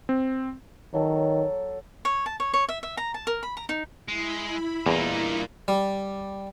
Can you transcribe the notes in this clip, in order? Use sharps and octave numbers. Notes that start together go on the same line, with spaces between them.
C4
D#3 F#3 A4
C#5
A5
C#5
C#5
E5
E5
A#5
A5
A#4
B5
A#5
D#4
G#3 E4 B5
E2 G2 A#2 A#3 D#4
G3